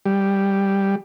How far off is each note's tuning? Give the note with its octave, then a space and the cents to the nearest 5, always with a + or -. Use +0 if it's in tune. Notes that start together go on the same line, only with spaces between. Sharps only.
G3 +5